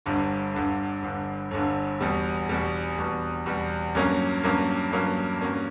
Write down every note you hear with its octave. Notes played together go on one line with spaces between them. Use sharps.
G1 G2 D3
G1 G2 D3
G1 G2 D3
G1 G2 D3
E2 B2 G3
E2 B2 G3
E2 B2 G3
E2 B2 G3
G2 F#3 A#3 C#4
G2 F#3 A#3 C#4
G2 F#3 A#3 C#4
G2 F#3 A#3 C#4